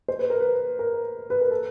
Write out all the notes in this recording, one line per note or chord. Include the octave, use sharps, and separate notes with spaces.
C5
B4
A#4
B4
A#4
B4
A#4
A4